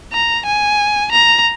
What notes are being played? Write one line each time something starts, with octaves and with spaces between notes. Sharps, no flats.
A#5
G#5
A#5